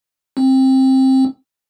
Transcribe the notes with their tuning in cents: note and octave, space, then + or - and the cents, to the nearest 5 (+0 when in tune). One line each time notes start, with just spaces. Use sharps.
C4 +15